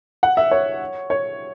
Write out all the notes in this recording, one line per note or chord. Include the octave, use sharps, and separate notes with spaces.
F#5
E5
C#5
C#5